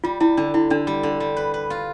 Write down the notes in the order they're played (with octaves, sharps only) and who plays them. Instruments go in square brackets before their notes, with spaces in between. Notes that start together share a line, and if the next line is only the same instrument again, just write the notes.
[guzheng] G3 [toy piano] F4
[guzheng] G3 [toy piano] E4
[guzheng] D3 [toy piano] D4
[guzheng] D3 [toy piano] E4
[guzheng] D3 [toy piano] D4
[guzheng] G3
D3
G3
B4
B4
F4